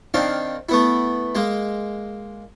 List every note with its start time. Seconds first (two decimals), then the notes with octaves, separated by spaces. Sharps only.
0.14 D#3 C4 D4 F5
0.69 A3 B3 E4
1.35 G#3 A#3